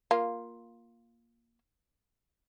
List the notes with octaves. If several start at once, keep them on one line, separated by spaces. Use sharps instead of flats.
A#3 F4